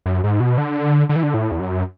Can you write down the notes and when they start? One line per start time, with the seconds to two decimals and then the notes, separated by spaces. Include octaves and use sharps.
0.06 F#2
0.24 G#2
0.40 B2
0.58 D3
1.09 D3
1.16 E3
1.23 D3
1.34 A2
1.52 E2
1.60 F#2